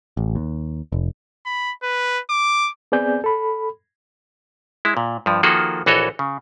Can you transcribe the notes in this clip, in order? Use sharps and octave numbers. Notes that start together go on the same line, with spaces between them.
A1
D#2
F1
B5
B4
D6
B3 C4 G#4 D5 G#5 G6
A4 B5
G#3 E4
A#2
G2 F3
D#3 F3 A#3 F#4 G#4 A4
A#1 E3 F#4 A4 C#5 D#5
C#3